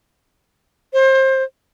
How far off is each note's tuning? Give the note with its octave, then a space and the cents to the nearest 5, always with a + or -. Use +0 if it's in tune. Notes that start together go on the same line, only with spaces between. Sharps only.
C5 +25